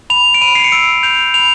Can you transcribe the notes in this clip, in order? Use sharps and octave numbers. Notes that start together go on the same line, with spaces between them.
B5 F7
D7
B5 D#7
C7
C#7
E6 D7
G6 F7
B5 F7